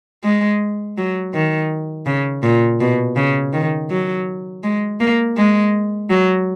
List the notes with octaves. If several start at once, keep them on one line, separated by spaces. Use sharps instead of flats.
G#3
F#3
D#3
C#3
A#2
B2
C#3
D#3
F#3
G#3
A#3
G#3
F#3